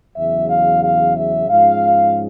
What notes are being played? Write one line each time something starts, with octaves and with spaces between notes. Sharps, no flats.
E2 C#3 F#3 E5
F5
F5
E5
G#2 F3 G#3 C#4 F5